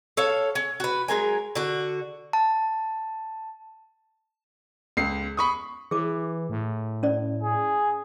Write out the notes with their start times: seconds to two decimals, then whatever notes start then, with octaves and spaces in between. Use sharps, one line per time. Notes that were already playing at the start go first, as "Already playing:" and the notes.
0.17 A4 C#5 F5
0.55 C#4
0.80 F#4 B4
1.08 F#3 G#3 A#4 G#5
1.55 D3 F#4
2.33 A5
4.97 C#2 C7
5.37 B5 C#6 D#6
5.91 E3 G#4 D6
6.50 A2
7.03 C#4 D5
7.43 G#4